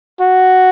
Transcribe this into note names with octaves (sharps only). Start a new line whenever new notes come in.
F#4